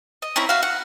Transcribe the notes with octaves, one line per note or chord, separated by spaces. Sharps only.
D#5
C4 C#4 E4 A#5
F#4 E5 F5
F#5